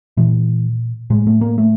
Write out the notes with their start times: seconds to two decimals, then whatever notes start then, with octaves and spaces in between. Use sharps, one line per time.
0.17 A#2 E3
1.10 A2 G#3
1.27 A3
1.41 A#3
1.58 A3